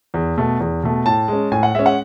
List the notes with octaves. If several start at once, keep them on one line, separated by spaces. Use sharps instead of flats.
E2
B2 A3
E2
B2 A3
A2 A5
G#3 C#4
A2 G#5
F#5
G#3 C#4 E5
F#5